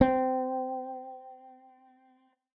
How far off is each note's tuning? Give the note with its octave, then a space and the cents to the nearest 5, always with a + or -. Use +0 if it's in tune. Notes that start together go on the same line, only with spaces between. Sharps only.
C4 -20